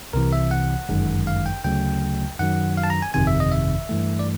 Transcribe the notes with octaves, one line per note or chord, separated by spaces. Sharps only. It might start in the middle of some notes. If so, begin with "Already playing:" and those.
C2 C3 E3 A#4
E5
F#5
G1 F#2 D#3 G#3
F5
G5
D2 C#3 F#3 A3 G5
F#2 D#3 F#3 F#5
F5
A5
A#5
G#5
G1 F2 C3 D#3 G#5
E5
D#5
E5
G2 E3 A3
D5